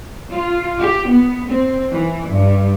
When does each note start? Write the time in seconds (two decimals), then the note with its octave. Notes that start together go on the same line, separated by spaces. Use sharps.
0.32 F4
0.81 G4
1.09 B3
1.50 C4
1.92 E3
2.29 G2